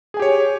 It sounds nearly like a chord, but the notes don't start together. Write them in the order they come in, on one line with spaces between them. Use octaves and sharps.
G#4 G#5 G4 C#5